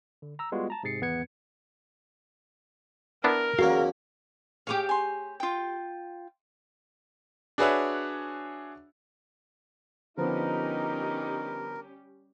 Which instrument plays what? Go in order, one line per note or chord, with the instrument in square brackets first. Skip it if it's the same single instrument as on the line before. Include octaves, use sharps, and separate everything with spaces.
[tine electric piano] D3
A#5 E6
G3 G#3 B3 F4 F#4
A5 A#5
G#2 C3 G#4 A6 C7 C#7
G#1 E2 B3 B4 G#6 C#7
[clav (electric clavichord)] B3 D4 E4 [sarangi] A#4
[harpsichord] E2 C#3 A#3 [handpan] F#4 [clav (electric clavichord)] F5
[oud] G4 G#4 C#5 [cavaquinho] F5 D6
[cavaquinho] G#5 C6
F4 G5
[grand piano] D4 F#4 G#4 B4 C#5 E5
[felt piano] D3 F3 B3 [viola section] G3 C#4 G4 [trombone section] D#4 [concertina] A#4